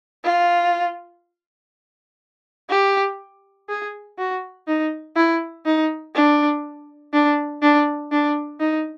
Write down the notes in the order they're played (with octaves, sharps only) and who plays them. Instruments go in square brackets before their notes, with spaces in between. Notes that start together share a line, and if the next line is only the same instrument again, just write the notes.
[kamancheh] F4
G4
G#4
F#4
D#4
E4
D#4
D4
D4
D4
D4
D#4